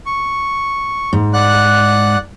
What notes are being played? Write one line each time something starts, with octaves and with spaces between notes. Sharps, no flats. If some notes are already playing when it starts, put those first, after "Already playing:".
C#6
G#2
D5 F#5 F#6